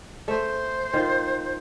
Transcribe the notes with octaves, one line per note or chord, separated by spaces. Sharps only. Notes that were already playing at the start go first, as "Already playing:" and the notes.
A3 C5 E5
D#3 F4